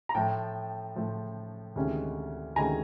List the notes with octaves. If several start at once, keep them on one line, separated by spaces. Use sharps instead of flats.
A#5
A2 F3 A3 G5 A5
A2 F3 A3
D2 C3 D#3 G#3 C#4
D2 C3 D#3 G#3 C#4 G#5 A#5